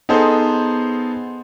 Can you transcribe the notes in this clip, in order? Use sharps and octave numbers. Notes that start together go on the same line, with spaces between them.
B3 D#4 G#4 A4 C5